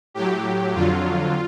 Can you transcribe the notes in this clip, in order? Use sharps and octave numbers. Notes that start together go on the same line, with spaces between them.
A2 F#3 G4
F2 D3 F#3 F4